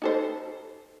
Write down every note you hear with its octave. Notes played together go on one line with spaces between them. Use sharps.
D#4 A4 C5